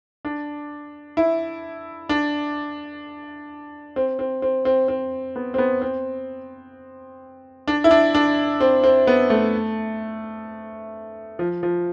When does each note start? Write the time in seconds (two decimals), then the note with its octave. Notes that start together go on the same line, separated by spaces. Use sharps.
0.25 D4
1.17 E4
2.09 D4
3.96 C4
4.19 C4
4.42 C4
4.65 C4
4.88 C4
5.36 B3
5.54 C4
5.58 B3
5.82 C4
7.68 D4
7.84 E4
7.91 D4
8.15 D4
8.60 C4
8.84 C4
9.07 B3
9.30 A3
11.39 F3
11.63 F3